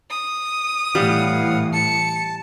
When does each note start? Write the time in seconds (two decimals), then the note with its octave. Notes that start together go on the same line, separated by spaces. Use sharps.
0.11 D#6
0.95 A2 E3 G3 F5 F#5
1.73 A5 C#7